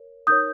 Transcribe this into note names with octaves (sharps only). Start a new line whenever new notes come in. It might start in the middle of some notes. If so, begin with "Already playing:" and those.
Already playing: A#4 C#5
D#4 A#4 C#5 D#6 G6